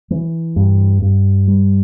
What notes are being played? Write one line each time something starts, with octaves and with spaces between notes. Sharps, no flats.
E3
G2
G2
G3